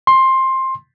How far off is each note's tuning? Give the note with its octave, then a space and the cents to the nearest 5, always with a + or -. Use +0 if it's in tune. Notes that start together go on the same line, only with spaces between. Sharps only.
C6 +15